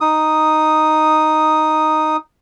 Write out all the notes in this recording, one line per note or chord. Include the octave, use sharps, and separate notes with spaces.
D#4 D#6